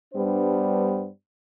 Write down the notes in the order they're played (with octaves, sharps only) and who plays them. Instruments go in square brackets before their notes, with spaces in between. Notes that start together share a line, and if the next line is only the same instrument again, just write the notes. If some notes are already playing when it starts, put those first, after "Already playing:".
[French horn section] G2 G3 B3 D4 C5